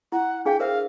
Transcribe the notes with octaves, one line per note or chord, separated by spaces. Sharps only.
E4 F#5
D4 G#4 F5 G5
A#4 C5 E5 F5